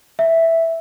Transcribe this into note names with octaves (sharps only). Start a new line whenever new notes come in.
E5